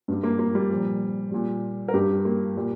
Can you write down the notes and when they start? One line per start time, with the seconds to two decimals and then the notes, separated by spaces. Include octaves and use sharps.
0.08 G2 G3
0.23 A#3
0.39 A#3
0.55 G3
0.70 A#2 F3
1.31 A#2 G3
1.88 A#4
1.94 G2 G3 G4
2.25 A#3
2.56 A#2 G3